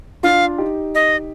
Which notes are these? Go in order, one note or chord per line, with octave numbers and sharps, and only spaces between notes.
D4 F4 F5
D#4 G4
D#5